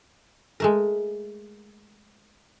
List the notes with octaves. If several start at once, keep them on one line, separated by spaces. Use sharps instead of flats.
G#3 A3 A#4